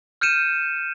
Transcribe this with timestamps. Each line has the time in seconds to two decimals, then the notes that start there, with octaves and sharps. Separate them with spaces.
0.21 F6 G6 C#7 D#7 E7